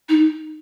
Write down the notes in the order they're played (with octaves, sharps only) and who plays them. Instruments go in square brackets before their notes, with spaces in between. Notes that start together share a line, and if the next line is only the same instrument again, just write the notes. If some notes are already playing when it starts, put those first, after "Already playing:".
[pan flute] D#4